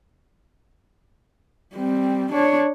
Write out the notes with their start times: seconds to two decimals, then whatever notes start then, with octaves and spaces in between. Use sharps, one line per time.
1.75 G3 C4
2.33 D4 C#5